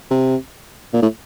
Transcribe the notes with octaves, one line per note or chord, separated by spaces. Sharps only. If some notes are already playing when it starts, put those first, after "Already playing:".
C3
A#2
A2